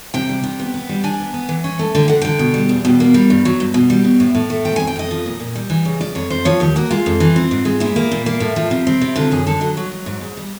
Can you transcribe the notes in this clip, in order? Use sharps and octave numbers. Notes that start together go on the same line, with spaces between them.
C3 G5
G3
C3
B3
B3
G3
D4 G#5
B3
B3
E3
C#4
A3
D3 G5
D3 F#5
D3 G5
B2
G3
E2
B2
A#3
G3
G2
F#3
G2
B2
G3
B2
A2
A2
A3
F3 G5
F2 G#5
G5
F2 D#5
F3
A#2
A#2
G3
E3
C#3
F3 D5
F2 C#5
F2 C5
F3 C#5
D#2 G4
A#3 F#4
G#3 F4
F2
E3
C4
G#2
G#3
A#2 E4
A#3
A#2
A#3
A2
F3
C3
C4
C3
D3 F4
F#2 G#4
D3 A4
F#3 D#5
F#3
F#3
G#2
G#2
G3